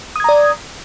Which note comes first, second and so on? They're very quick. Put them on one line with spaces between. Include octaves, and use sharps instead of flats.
D#6 G#6 A#5 D5